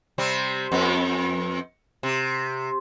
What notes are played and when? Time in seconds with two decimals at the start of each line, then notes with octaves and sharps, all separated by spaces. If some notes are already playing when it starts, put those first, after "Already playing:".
0.18 C3 G3 C4
0.72 F2 B3
2.03 C3